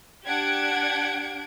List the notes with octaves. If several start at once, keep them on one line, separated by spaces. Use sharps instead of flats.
D4 G4 F#5 G#6 D7